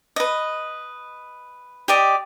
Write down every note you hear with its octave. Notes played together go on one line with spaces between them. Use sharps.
B4 D#5
G4 D5 D#5 G5